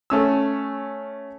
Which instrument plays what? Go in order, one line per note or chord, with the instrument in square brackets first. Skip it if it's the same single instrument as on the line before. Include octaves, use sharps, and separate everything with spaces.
[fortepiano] A3 C#4 E6